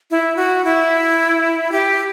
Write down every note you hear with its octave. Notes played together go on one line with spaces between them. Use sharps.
E4
F#4
E4
G4